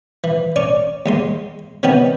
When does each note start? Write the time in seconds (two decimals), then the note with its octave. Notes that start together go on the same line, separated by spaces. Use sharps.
0.24 E3
0.56 C#4 D5 C#6
1.06 D#2 G#3 C6
1.83 C3 D#3 B3 C#4 A5